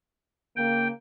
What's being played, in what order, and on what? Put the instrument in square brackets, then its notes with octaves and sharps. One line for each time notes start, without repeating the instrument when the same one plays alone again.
[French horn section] C#3 A#3 [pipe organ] G5